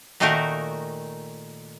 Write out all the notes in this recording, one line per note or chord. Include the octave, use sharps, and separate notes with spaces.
A#2 D#3 A3 D#4 F#4 A#4